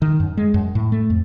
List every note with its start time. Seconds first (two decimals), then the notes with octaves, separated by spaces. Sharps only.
0.02 D#3
0.20 F#2
0.37 G#3
0.54 F#2
0.75 A2
0.92 A3
1.10 F2